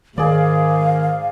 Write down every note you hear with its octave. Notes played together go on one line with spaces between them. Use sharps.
G#2 D#3 G#4 D5 F5